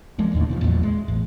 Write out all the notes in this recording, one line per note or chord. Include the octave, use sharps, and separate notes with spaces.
F3 G#3 A#3
E1 D#2 A2 D3
B2 D#3 F3
A1 E2 A#2 F#3
G#3
A1